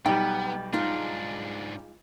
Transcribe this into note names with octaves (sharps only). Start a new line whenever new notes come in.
B1 G3 B3 D#4 G5
G#2 G#3 D4 D#4 F4